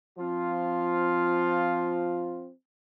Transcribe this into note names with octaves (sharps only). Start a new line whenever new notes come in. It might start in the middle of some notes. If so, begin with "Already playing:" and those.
F3 C4 F4